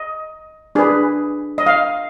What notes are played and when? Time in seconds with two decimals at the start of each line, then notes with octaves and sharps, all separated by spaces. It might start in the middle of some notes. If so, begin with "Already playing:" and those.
Already playing: D#5
0.75 D4 G#4 B4
1.58 D#5
1.66 F5